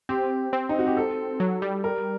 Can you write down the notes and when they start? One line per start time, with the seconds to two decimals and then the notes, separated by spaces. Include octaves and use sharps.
0.09 C4 G4
0.53 C4
0.69 D#4
0.79 F#4
0.87 G4
0.97 A4
1.40 F#3
1.62 G3
1.84 A#4